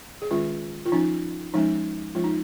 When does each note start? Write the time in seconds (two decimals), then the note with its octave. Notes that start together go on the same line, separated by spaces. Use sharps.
0.22 G#4
0.31 D#3 G#3 C#4 F4
0.86 F4
0.92 F3 C#4 D#4
1.54 F3 G#3 C#4 D#4
2.15 F3 G#3 C#4 F4
2.24 D#4